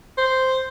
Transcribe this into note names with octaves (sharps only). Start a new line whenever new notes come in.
C5